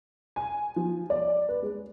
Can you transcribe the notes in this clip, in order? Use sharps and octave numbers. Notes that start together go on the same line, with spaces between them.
G#5
F3
D5
B4
G#3